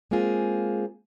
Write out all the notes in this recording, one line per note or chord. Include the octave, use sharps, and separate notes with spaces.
G#3 A#3 C4 F4 G#4